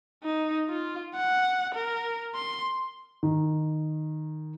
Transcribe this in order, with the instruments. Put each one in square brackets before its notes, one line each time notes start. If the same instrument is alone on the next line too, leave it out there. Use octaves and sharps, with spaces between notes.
[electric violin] D#4
F4
F#5
A#4
C6
[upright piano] D#3